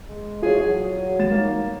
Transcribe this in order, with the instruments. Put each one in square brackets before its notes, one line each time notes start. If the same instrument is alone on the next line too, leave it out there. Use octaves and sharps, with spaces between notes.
[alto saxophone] G#3
[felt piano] F4 F#4 C#5 [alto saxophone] G#4
[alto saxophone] F#3
[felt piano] G3 A6 E7
[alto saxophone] A#3 [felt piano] D#4 C#5